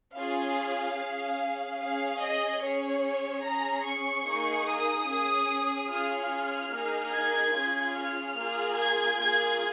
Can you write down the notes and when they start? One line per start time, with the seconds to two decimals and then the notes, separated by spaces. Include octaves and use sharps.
0.14 C#4 F4 G#4 F5
0.96 C#4 G#4
1.79 C#4 G#4 F5
2.20 D#5
2.61 C#4 G#4 C#5
3.43 C#4 G#4 A#5
3.85 C#6
4.25 A#3 D#4 G#4
4.66 D#6
5.07 C#4 G#4
5.90 C#4 F4 G#4 F6
6.72 A#3 D#4 G#4
7.14 G#6
7.54 C#4 F4 G#4
7.95 F6
8.37 A#3 F4 G#4
8.78 G#6
9.19 A#3 F4 G#4 G#6